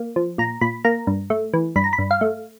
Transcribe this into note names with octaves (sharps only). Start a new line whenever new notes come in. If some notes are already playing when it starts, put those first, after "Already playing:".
Already playing: A#3
F3
A#2 A#5
A#2 B5
A#3 A#5
G2
A3
E3
G2 B5
A#5
B5
G2
F5
A3